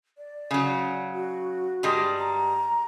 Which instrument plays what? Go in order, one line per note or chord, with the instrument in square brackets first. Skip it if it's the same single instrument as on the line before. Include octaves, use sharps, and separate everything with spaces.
[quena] D5
[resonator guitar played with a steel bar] C#3 F#3
[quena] F#4
[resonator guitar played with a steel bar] G2 G3 G#3
[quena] A#5